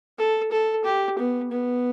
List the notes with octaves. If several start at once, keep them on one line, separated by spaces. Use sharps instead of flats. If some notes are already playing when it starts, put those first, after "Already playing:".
A4
A4
G4
B3
B3